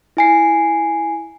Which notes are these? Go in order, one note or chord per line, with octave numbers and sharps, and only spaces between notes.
E4 G#5 C7